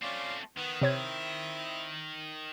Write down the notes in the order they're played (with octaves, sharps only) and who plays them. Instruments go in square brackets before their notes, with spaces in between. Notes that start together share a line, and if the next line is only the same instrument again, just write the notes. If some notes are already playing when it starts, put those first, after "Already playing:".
[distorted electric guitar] A3 C4 [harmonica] C#4 F4 D5
[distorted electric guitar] D#3 [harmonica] B3
[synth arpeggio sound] C3 C#5 G#6 [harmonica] C4 E4